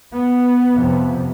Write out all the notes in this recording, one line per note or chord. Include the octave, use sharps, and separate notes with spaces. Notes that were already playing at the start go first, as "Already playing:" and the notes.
B3
F2 C3